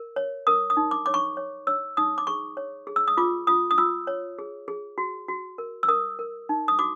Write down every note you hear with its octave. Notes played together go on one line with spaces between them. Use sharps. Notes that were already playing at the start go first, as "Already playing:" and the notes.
Already playing: A#4
C#5
A#4 D#6
D#6
D#4
D6
C#5 D6
C#6
C#5
C#5 E6
D#4 D#6
D6
G#4 C#6
C#5
G#4
E6
D#6
F4 D6
F4 D#6
D#6
F4 E6
C#5
G#4
G#4
F#4
F#4
A#4
E6
A#4 D#6
A#4
D#4
D#6
F#4 D6